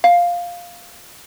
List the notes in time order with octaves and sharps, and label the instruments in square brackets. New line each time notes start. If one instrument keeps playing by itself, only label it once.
[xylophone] F5